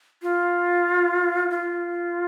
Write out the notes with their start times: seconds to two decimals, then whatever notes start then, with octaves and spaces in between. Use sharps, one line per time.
0.22 F4
1.50 F4